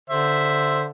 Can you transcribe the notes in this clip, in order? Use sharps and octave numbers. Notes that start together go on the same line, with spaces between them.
D3 C5 E5